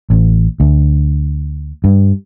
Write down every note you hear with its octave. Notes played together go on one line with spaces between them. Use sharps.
A1
D2
G2